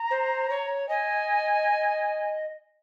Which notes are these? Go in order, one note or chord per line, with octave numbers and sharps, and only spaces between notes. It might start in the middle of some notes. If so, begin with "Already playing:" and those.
Already playing: A#5
C5
C#5
D#5 G#5